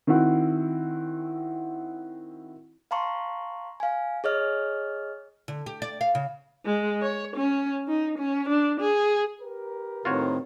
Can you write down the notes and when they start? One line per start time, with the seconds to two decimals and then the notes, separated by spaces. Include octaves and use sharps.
0.07 D#3 C4 E4 F#4
2.91 F5 A5 A#5 C6 C#6
3.80 F5 G#5
4.24 G#4 C#5 D#5 F6
5.48 D3
5.66 G4
5.82 D5
6.01 F5
6.15 C#3
6.66 G#3
7.02 C#5
7.37 C#4
7.88 D#4
8.19 C#4
8.49 D4
8.81 G#4
9.41 G4 A#4 B4
10.05 A2 D#3 C4 F4 F#4 C#5